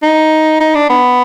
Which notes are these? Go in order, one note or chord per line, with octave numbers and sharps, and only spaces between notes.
D#4
D#4
D4
B3